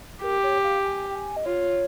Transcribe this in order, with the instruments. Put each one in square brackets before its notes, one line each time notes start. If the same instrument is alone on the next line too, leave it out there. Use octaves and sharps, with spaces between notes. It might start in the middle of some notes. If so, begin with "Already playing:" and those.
[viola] G4 [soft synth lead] A#4
[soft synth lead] C#5
F5
G#5
G5
G#5
D#5
[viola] F4 [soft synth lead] C#5